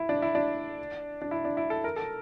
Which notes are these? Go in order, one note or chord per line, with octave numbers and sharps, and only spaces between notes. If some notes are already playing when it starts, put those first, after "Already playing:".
Already playing: E4
D4
E4
D4
D4
E4
D4
E4
A4
A#4
A4